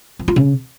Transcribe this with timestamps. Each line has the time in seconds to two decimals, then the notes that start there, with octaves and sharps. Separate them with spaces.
0.19 F3
0.28 F4
0.36 C#3